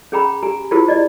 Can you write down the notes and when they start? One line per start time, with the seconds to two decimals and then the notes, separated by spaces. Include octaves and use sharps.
0.12 C#4 G#4 G5 A#5 B5
0.43 G4 G#5 A#5
0.71 E4 F4 G4 G#4 A#4 C5
0.88 E4 D5 D#5